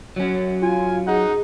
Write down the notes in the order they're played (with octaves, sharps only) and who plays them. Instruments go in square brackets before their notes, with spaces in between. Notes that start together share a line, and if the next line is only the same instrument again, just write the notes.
[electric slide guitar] F#3 C#4
[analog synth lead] F4 [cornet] G#5
[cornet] D#4 [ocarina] G#4 [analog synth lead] F#5